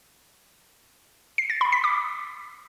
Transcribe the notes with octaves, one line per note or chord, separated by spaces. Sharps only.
C7
A6
B5
B6
D6